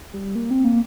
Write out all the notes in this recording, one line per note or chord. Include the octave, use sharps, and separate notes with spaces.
G3
A#3
C4
A#3